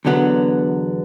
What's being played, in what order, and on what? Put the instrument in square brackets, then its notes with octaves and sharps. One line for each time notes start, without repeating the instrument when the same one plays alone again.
[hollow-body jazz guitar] E2 D3 F#3 B3